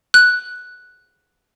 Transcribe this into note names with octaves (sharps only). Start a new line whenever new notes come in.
F#6